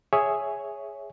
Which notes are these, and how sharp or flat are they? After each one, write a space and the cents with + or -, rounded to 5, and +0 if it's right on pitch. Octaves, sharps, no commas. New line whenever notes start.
G#4 +0 C#5 +5 E5 +0